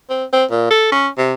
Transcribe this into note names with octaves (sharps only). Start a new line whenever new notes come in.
C4
C4
A#2
A4
C#4
C3